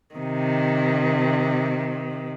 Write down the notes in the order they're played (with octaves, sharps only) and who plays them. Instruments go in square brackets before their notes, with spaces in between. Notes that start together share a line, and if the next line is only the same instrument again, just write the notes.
[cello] C3 D#3